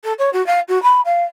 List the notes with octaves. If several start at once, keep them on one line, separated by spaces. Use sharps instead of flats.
A4
C#5
F#4
F5
F#4
B5
F5